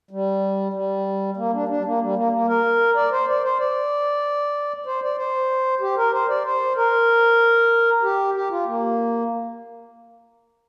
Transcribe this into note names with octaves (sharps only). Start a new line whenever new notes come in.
G3
G3
A#3
D4
D4
G3
A#3
G3
A#3
A#3
A#4
D5
C5
D5
C5
D5
C5
D5
C5
G4
A#4
C5
D5
C5
A#4
G4
G4
F4
A#3